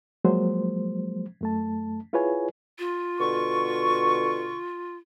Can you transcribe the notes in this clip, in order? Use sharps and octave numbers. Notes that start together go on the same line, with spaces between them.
F3 F#3 G#3 A#3 C5
F#2 A3 A5
E4 F4 G#4 B4 C#5 G#5
F4
B2 D3 C#6